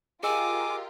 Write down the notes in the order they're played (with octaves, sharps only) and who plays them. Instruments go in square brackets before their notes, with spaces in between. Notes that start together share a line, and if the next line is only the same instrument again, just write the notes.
[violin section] F4 G4 A#4 [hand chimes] G#4 D#5 E6 [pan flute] G#5 [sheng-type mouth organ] D6